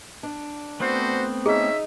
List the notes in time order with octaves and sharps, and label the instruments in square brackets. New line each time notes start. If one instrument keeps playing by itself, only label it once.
[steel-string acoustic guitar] D4
[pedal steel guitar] A3 B3 C4 [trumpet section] F#4 C5
[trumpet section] C#4 E5 [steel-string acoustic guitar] D#4 [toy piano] G#4